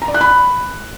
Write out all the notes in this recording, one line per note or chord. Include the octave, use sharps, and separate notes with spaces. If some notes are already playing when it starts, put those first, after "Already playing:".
A#5
D5
F#6
B5